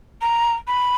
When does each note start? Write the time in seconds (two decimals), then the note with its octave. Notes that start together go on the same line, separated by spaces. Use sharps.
0.21 A#5
0.67 B5